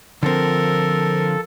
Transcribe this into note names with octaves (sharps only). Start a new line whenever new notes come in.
D3 F3 C4 A4 A#4